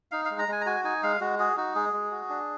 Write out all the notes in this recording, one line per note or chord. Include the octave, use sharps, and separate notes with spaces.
D#4 F5
F5
G#3
A#5
G#3 G#5
A#5
F#4 G#5
D#4 G#5
G#3 F5
G#3 F#4
F#4 G#4
D#4 F#4
G#3 G#4
G#3
F#4
D4